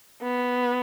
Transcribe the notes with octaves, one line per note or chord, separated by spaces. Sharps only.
B3